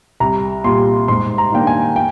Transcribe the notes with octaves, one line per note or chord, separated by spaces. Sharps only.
C2 A#5
A#2 G3 C6
G#2 C6
A#5
D#3 A#3 D4 G5
G#5
G5